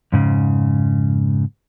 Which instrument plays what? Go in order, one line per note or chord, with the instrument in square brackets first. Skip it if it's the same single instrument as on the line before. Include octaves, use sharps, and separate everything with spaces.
[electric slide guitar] F2 G#2 C#3